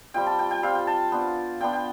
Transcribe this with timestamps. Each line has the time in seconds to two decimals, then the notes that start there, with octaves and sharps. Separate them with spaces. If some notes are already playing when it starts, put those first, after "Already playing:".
0.14 G3 C4 F4 G5
0.27 A5
0.39 G5
0.51 G5
0.63 G3 C4 F4 F5
0.75 G5
0.87 A5
1.12 B3 D4 F4
1.60 B3 D4 F4 G5
1.73 G5